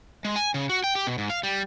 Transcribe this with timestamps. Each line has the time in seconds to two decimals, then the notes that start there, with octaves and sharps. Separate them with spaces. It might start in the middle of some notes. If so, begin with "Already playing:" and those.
0.25 G#3
0.36 G#5
0.54 C#3
0.69 F#4
0.84 G5
0.95 G4
1.07 B2
1.18 G#2
1.30 F5
1.43 G3